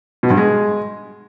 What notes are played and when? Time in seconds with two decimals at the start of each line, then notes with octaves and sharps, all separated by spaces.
0.23 B2
0.30 G2
0.37 G#3